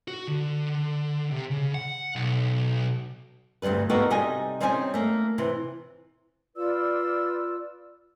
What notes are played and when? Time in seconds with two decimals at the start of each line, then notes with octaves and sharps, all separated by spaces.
0.08 F#4
0.28 D3
1.31 C3
1.51 C#3
1.75 F#5
2.16 B1
3.62 D2 G2 C3 G3 B4
3.90 A#3 B3 D#4 F#4 G4 A4
4.10 C3 G3 D#4 D#5 G#5
4.60 G3 C4 C#4 D#4 G5 G#5
4.94 A3 A#3
5.38 C3 E3
6.56 F4 B4 D5 E6